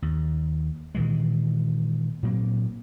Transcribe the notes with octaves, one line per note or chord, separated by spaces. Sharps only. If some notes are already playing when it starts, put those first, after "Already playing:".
D#2
A#2 D#3 E3 G#3
A#2 F#3 A#3 C4